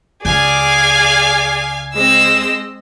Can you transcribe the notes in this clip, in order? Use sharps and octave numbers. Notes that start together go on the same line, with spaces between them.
C#2 G#4 D5 F5 G#5
G#3 C4 D#5 E6